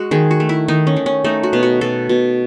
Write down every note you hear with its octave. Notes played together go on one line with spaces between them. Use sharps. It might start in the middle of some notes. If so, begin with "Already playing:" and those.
Already playing: G#3 F#4
D#3 G#4
F#4
A3
E4
D#3 D#4
C#4
D#3
C#4
A3 D#4
F#4
B2
F#4
B2 A4
B2